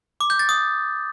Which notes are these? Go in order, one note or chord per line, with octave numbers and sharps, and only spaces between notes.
D6
G6
A6
D#6